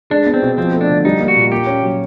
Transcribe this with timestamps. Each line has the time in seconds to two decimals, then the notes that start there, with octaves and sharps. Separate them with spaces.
0.10 G#3 D4
0.26 B3
0.34 C4
0.42 B2
0.58 F3 C4
0.73 A3
0.81 D4
0.90 D3
1.05 G3 D#4
1.20 A#3
1.28 F#4
1.36 A#2
1.52 A#3 G4
1.67 C#4
1.83 F#3